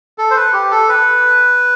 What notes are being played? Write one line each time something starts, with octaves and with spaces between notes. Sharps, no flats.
A4
C5
B4
G4
A4
B4